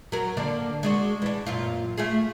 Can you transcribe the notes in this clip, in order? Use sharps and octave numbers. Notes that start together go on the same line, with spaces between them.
F#3 A#4
D3 A#3 D4
G#3 D4 F#4
E3 D4
F#2 A#2 F4
A3 F4 G#4